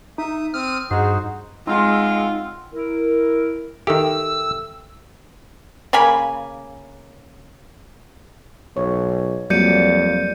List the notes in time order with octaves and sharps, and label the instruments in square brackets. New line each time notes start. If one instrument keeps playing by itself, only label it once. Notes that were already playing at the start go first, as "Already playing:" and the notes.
[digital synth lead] D#4 [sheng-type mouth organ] E5 D#6
[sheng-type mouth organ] C4 D#6 [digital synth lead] F6
[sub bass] G2 [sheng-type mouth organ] D#4 F#4 C5 [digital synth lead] G#4
[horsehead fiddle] G#3 [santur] C4 F#5 C6 [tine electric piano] D#4 [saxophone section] F4
[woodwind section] E4 A#4
[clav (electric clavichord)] D#3 G4 [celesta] A4 E5 G5 [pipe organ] E6
[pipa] C#3 A#3 G#5 B5
[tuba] B1 [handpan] C#5
[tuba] F2 [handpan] F#3 G3 A#3 [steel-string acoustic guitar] D5 [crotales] G6 C#7 D#7